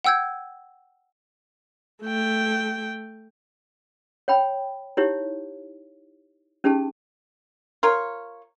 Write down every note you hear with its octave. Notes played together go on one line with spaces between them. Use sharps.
F#5 G5 E6 G6 G#6
A3 G5
C#5 G5 B5
D#4 E4 G4 C#5
C#4 D#4 G4 G#4 A5
F4 A#4 C#5